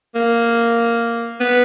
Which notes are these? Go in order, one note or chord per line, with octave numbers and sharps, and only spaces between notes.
A#3
B3